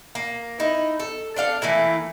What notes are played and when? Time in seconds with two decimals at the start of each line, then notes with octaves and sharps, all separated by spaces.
0.15 A#3
0.60 D#4 E4
0.99 A4
1.36 D4 A4 F5
1.62 E3 A3 A#3 E4